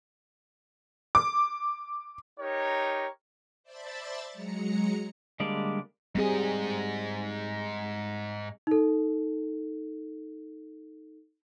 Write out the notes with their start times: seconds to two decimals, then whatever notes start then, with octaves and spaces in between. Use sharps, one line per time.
1.15 D6
2.39 D#4 G4 A#4 C#5
3.63 C5 D5 E5 A5 B5 A6
4.31 F#3 G#3 A#5 C#7
5.40 D3 G3 G#3 A#3 D5
6.15 G#2 G3 C4 G#4 D#5
8.67 D#4 A4